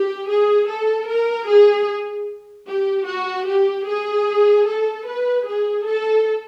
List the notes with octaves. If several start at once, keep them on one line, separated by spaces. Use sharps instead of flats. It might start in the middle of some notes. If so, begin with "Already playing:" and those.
Already playing: G4
G#4
A4
A#4
G#4
G4
F#4
G4
G#4
A4
B4
G#4
A4